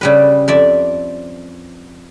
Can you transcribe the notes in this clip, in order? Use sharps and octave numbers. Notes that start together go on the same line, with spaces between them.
C#3 G3 B4
F2 D5 E5